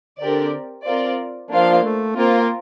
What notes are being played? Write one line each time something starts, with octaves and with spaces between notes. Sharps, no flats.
D3 C4 G4 A#4 D5
C4 F4 A#4 D5
F3 A#3 D4 F4 C5 F5
A3
A#3 C4 F4 A#4